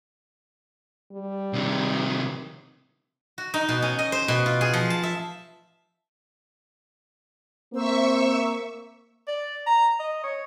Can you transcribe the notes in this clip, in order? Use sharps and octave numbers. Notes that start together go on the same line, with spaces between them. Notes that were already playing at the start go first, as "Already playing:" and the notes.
G3
C3 D#3
F#4
D#4
B2
C#4
D#5
C5
B2
F4
G#4
F3
A5
E5
A#3 C4 C5 E5 C#6 E6
D5
A#5
D#5
C#5